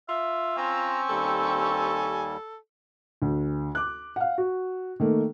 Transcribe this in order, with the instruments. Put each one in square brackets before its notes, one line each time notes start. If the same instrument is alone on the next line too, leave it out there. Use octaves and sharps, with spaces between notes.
[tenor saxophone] F4 [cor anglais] E5
[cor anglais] C4 [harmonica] G#5 C#6 [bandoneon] A#5 E6
[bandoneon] D#2 G3 [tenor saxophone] A4
[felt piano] D2
D6 F#6
F5 F#5
F#4
D#3 A3 A#3